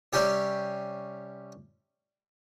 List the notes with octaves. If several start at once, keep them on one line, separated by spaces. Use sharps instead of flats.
C3 G3 C#4 G4 C#5